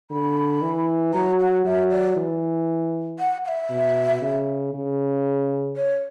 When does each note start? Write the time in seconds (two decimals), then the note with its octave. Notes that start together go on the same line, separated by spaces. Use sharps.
0.11 D3 B5
0.62 E3
1.14 F#3 A#5
1.40 F#5
1.65 F#3 E5
1.91 D5
2.17 E3
3.19 F#5
3.45 F#5
3.48 E5
3.70 B2
4.22 C#3
4.74 C#3
5.76 C#5